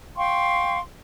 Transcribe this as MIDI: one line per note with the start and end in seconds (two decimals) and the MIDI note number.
0.16 0.79 77
0.16 0.79 79
0.16 0.79 84
0.16 0.79 85